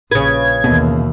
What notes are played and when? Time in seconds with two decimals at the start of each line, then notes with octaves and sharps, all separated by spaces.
0.11 A#1 C#3 B4 G#6
0.64 D#2 B2 E3